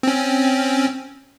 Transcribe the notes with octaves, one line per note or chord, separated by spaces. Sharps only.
C4 C#4